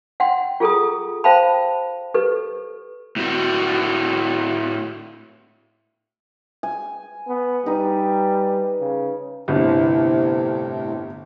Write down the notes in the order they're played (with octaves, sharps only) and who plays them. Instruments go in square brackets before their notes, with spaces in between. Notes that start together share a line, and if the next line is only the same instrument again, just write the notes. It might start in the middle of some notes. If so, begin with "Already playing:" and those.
[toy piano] F#5 G5 C6
F4 G#4 A4 A#5 D#6
C5 F5 G5 A5 B5
G4 A4 B4
[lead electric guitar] A2 F#4
[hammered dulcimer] G#5
[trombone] B3
[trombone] G3 [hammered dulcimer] D#4 B4
[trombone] C#3
[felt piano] G1 [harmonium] A2 C3